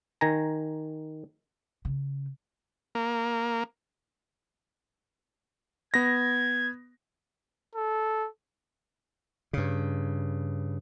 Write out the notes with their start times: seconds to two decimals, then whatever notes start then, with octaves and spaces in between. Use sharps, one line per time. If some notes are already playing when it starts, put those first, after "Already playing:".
0.21 D#3 G#5 A#5
1.85 C#3
2.95 A#3
5.94 B3 G#6 A#6
7.75 A4
9.53 G2 C#3